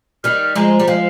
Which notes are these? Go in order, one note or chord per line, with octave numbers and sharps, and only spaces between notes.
D#3 G3 F6
F3 G#3 A#5
G3
F3 G#3 F5